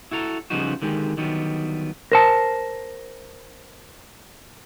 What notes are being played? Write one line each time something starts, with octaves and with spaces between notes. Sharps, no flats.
E4 F#4 A4 A#5
C#3 F3 G3 B3 D#4 F#4
D3 D#3 G#3 G4
D3 D#3 F#3 G3 B3
A#4 C5 A5